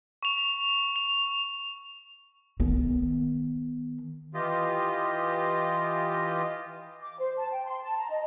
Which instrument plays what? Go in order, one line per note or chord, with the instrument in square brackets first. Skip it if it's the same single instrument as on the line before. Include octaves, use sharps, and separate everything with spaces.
[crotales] C#6 F7
F7
[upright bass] D#3 B3
[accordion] E3 F4 G4 D#5
[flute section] D6
C5
A5
G5
C6
A5
A#5
D#5